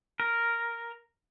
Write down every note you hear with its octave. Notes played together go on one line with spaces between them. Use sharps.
A#4